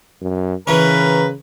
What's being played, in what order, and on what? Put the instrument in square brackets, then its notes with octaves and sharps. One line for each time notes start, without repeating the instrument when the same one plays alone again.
[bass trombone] F#2
[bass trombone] C#3 [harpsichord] E3 C#4 [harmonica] A#4 B4